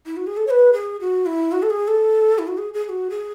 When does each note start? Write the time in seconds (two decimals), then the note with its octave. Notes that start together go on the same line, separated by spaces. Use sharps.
0.06 E4
0.17 F#4
0.27 G#4
0.37 A4
0.47 C#5
0.51 B4
0.73 G#4
1.00 F#4
1.26 E4
1.52 F#4
1.62 A4
1.70 G#4
1.88 A4
2.38 E4
2.47 F#4
2.58 G#4
2.74 G#4
2.84 G#4
2.89 F#4
3.10 G#4